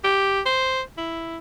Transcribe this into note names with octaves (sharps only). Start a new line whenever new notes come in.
G4
C5
E4